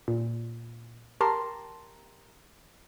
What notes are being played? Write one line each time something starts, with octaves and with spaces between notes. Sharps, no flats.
A#2
G4 A#4 A5 A#5 C6